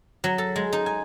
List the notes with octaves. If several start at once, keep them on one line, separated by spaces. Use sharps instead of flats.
F#3
A4
G#3
D#4
G#5